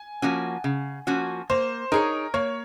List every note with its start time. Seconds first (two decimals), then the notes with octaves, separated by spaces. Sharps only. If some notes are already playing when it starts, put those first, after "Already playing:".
Already playing: G#5
0.22 F3 A#3 C#4 F#4
0.64 C#3
1.07 F3 A#3 C#4 F#4
1.50 A#3 C5
1.92 D#4 G#4 A#4 C#5
2.34 A#3 C#5